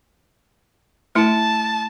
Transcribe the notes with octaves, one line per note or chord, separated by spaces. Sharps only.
A3 E4 A5